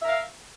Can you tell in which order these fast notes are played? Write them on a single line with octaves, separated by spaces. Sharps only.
E5 A#4 F5